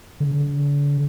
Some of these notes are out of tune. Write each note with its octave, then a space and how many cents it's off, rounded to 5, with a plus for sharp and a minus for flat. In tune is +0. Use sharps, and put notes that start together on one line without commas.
D3 -40